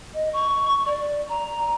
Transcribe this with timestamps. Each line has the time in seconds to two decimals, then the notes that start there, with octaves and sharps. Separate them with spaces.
0.14 D#5
0.33 C#6
0.86 D5
1.29 A#5